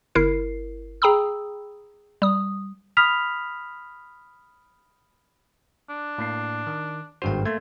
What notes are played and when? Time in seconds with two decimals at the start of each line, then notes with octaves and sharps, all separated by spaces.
0.15 G1 E4 A#4 C7
1.02 G#4 G5 A#5 B5 D#6 E6
2.22 G3 D#6
2.97 B5 D#6 F6 B6 F7
5.90 D4
6.18 A2 A#3 C7
6.67 D#3
7.22 G#1 G2 F#4 C5 G5
7.45 A3 A#3 C6 G#6